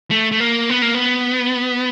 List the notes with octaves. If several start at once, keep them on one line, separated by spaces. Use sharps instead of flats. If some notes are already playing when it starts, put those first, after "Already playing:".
A3
A3
A#3
B3
A#3
B3